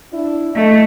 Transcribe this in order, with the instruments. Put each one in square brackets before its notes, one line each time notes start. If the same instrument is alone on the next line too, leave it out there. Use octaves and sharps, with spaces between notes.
[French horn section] D4 E4
[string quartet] A3 [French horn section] E4 A4 D#5